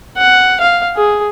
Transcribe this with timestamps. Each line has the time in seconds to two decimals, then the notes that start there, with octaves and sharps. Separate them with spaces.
0.18 F#5
0.60 F5
0.96 G#4